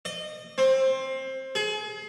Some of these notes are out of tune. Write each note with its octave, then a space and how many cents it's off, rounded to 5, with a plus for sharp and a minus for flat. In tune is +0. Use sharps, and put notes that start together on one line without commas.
D#5 -25
C4 +20
G#4 +35